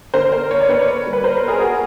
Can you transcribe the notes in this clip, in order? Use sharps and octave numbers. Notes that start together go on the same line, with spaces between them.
D3 A#4 C5
A#3 A#4 C5
A#3 C#5
D5
D3 B4 C#5
A#3
G3
B4
A#3 A#4 C5
A#3
G#4 A#4
A#3 F#4 G#4